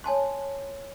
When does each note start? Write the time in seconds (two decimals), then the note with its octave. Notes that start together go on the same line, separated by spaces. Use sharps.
0.04 C#5 G#5 A5 C6